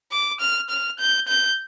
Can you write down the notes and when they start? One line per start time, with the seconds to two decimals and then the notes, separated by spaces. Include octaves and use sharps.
0.12 D6
0.40 F6
0.70 F6
0.99 G6
1.28 G6